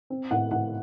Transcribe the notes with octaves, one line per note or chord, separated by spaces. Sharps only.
C4
A2 F#5
A2 F#5